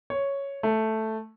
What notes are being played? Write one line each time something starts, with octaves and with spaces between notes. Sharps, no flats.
C#5
A3